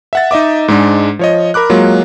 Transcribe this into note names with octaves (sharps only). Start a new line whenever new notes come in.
E5 F#5 A6
D#4 D#5 E5 D6
G#2 G#3 D4
F3 C#5 D#5
A#4 B5 D6 F#6
F#3 G#3 A#3 F4